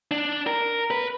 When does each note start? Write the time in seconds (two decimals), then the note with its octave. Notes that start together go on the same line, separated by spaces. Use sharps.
0.11 D4
0.47 A#4
0.91 B4